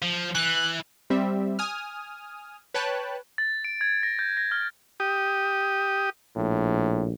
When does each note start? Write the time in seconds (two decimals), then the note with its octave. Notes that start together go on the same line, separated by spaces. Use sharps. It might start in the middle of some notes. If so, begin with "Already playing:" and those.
0.02 F3
0.35 E3 F#6
1.10 G3 C4 E5
1.59 G#5 D#6 F6
2.74 B4 C#5 G5 A5 F#6
3.38 A6
3.65 D7
3.81 G#6
4.03 A#6
4.19 G6
4.37 A#6
4.51 F6
5.00 G4 D#6
6.36 A#1 A2